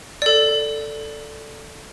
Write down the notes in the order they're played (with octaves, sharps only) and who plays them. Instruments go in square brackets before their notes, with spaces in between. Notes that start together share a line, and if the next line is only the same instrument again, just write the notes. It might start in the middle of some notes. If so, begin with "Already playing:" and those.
[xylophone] A4 D5